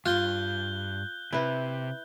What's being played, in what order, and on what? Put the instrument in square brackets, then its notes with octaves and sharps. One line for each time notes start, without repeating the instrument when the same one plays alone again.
[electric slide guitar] E2 G2 [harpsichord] F4 [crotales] F#6 G6 G7
[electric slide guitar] C3 [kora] E4 B4